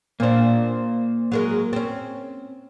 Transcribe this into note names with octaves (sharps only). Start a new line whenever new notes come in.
A#2 A#3 D4 C5
F#3 G#3 A#4
C4 C#4